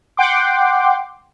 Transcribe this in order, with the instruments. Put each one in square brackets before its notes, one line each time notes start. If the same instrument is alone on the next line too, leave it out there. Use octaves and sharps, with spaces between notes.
[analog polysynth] F#5 G5 C6 D6